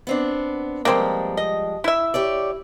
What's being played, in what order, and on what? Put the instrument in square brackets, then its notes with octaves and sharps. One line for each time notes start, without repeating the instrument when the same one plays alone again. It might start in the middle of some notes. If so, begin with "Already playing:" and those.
[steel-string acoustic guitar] B3 C4 D4
[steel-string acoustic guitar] F3 G3 G#3 [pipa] A#3 C4
[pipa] D#5
E4 E5
[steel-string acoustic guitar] G4 C#5 D5